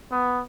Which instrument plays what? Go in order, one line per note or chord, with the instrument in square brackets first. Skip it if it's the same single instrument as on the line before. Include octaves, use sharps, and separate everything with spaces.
[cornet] B3